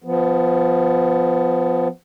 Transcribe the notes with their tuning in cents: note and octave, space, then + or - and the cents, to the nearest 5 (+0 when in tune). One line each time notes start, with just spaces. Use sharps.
F3 +0 B3 +20